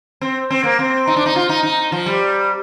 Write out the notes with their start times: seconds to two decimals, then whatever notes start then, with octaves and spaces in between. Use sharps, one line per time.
0.21 C4
0.50 C4
0.64 A#3
0.79 C4
1.07 D#4
1.16 D4
1.26 D#4
1.36 F4
1.49 D#4
1.63 D#4
1.92 F3
2.06 G3